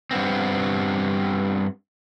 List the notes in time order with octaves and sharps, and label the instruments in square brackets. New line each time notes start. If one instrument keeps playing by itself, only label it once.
[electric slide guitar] G2 B3 C4